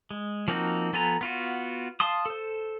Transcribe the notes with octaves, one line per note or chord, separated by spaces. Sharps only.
G#3
F3 A#3 C4 D#4 F#4
F3 B3 A4 G#5 A#5
B3 F4 F#4
F5 A5 C6 D#6
A4 C5